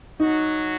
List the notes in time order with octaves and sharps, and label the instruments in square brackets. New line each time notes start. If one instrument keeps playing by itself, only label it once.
[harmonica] F#3 F#4 [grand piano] D#4